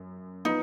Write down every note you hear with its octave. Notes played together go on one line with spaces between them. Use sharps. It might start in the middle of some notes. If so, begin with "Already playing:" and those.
Already playing: F#2
F3 B3 D#4 F4